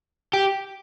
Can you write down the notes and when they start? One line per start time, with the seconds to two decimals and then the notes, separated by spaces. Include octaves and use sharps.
0.33 G4